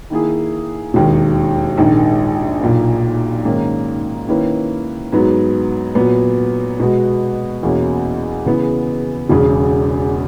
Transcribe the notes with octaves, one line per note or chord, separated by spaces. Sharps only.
D#3 A#3 E4 G#4
E1 D#2 D#3
A#1 G#2 D#3
B1 A#2 A#3
G#2 D#3 A#3 C#4
D#3 A#3 C#4 E4 B4
G#2 F#3 B3
A#2 F#3 B3
B2 G#3 B3 F#4
E2 B2 A#3 C#4
C#3 E3 B3
E1 E2 C#3